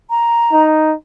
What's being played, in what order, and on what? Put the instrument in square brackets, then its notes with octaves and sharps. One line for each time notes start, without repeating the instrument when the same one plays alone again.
[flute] A#5
[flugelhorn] D#4